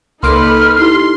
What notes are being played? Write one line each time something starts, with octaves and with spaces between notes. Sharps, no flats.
C#2 A#3 D#4 A4 B4 C6 D6 F6
D#4 E4 G4 C6